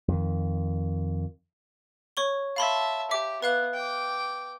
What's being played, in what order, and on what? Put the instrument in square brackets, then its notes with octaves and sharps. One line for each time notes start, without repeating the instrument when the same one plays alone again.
[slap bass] F2 D#3
[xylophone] C#5 C#6 G7
[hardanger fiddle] E5 A5 [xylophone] F5 B5 C6
[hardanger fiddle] G4 [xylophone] E5 D6
[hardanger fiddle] B3 [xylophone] B4 F5 F#6
[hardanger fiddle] G5 D6